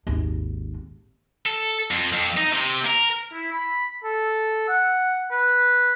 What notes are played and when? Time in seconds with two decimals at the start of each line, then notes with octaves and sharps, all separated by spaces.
0.07 G#1 D#2
1.46 A4
1.91 F2
2.13 F2
2.37 D#4
2.53 C3
2.85 A#4
3.33 E4
3.52 B5
4.04 A4
4.68 F#5
5.31 B4